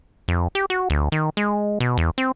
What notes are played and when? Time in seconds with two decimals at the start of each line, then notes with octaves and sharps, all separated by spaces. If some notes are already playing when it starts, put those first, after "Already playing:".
0.28 F2
0.55 G4
0.70 F#4
0.90 D2
1.12 D#3
1.37 G#3
1.80 B2
1.98 E2
2.18 C4